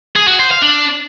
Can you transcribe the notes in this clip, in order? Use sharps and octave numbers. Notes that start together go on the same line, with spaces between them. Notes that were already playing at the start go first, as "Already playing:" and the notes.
G#4
F#4
C5
F5
D4